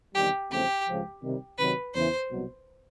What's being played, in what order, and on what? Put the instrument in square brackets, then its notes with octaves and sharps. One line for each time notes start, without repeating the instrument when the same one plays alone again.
[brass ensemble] E2 C3 D#3 G3 [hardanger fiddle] G4
[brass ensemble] E2 C#3 F3 A3 C4 [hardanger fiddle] G4
[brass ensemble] C#2 C#3 F3
C3 D#3 G3
[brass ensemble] C3 D#3 F#3 [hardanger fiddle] B4
[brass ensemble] E2 C#3 E3 [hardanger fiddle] C5
[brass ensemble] C2 B2 F#3